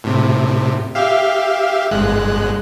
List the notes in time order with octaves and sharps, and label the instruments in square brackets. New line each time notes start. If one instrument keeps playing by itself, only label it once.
[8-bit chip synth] A2 C3
G4 E5 F5
G1 G#3 F#6